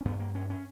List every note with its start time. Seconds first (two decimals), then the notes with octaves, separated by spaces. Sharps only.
0.01 C#4
0.05 G2 B3
0.20 A#3
0.35 C#4
0.50 C#4